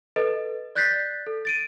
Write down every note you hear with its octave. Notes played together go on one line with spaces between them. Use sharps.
A4 B4 D#5
D5 F#6 G6 A6 B6 C7
A4
A6 D7 D#7